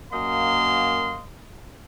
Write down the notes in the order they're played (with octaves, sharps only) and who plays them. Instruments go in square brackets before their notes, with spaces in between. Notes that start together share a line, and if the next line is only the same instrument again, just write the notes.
[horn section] F#2 A#3 D#5 F5 C6